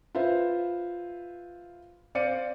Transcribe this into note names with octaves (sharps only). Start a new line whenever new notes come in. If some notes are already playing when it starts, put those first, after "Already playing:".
F4 B4 C5 E5
C4 C5 D5 F5 C#7 D#7